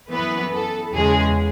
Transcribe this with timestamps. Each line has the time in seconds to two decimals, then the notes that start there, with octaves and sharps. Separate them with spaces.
0.11 F#2 E3 B3 B4
0.53 A4
0.93 E2 C#3 G#3 G#4